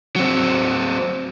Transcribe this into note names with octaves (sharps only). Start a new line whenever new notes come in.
F#3 C4